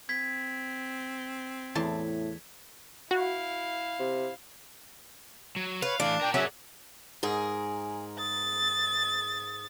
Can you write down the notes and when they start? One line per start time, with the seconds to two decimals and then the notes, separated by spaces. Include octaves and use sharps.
0.09 C4 G#6 B6
1.75 E2 A2 A5 C6
3.11 E4 F#4 F5
4.00 C3
5.56 F#3
5.82 B4 C#5 F5
6.00 E3 A3 D4 F5
6.21 A#4 D5 G5
6.34 F#3 C#4 G#4 E5
7.23 G#2 G#4 A#4 G#5
8.19 D#6 A6